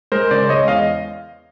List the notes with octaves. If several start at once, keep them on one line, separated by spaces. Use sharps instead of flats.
G#3 A#4 C5
C#3 C5 D5
G#3 C#5 D#5
E2 D#5 F5